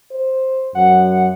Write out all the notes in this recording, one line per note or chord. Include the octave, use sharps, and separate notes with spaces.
C5
F#2 F#5